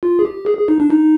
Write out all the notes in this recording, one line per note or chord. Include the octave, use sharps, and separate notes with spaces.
F4
G#4
G4
G#4
G#4
D#4
D4
D#4